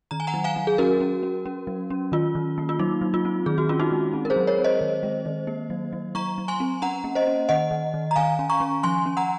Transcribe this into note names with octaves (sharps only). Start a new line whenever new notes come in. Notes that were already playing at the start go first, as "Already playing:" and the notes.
D#3 A#5
G#5
F#5 A#5
F#3
F5 G#5
F#3
G#4
C#4 F#4 A#4
C#4
C#4
C#4
F#3
C#4
D#3 F4
D#3
A#3
F4
F#3 D#4
F#3
F4
C4
D#3 G#4
F#4
C#4 F4
D#4 F#4
G#3
C4
A#4
G#4 C5
F#3
A#4 C#5
C4
C5 D#5
D#3
G#3
D#3
A#3
F#3
F#3
F#3 A#5 C#6
F#3
G#5 C6
C4
C#4 F#5 A#5
A#3
C5 D#5
C#4
D#3 D#5 F#5
D#3
D#3
A#5
D#3 F5 G#5
C#4
A#5 C#6
C#4
F3 G#5 C6
C#4
F#5 A#5